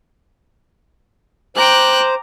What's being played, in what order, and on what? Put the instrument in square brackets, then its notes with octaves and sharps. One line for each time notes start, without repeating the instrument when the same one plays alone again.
[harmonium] C5 [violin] G5 F#6 [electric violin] A#5 D6